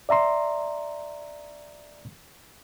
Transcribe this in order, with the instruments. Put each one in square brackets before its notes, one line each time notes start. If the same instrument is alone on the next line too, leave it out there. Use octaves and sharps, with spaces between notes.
[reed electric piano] D5 E5 A#5 C6